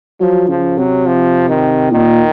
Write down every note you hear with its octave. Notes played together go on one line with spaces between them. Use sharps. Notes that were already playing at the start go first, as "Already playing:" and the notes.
F3 F#3
C#3 F3
C3 F#3
F3
D#3
A#2 D#3